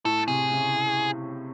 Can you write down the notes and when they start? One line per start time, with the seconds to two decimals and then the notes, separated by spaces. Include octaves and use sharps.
0.05 A2 A4
0.28 C3 G#4
0.52 C#3